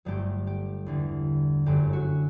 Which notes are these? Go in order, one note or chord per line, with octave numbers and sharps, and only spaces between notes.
G1 G2 F#3 A3 G4
G4
E2 D3 G3
G1 F#2 D3 A3 G4
F#4